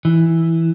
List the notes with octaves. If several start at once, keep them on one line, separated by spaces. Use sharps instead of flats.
E3